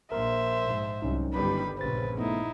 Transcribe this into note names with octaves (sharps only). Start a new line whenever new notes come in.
A#1 A#2 A#4 C5 E5 C6
G#2
C2 F#3 C#4 D#4
G1 D#3 G3 B4 B5
A#1 C#3 B4 C5 A6
A3 B3 D#4 E4